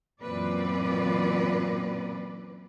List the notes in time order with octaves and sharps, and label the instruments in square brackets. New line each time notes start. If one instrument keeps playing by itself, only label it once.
[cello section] F#2 A#2 E3 C4 B4 D5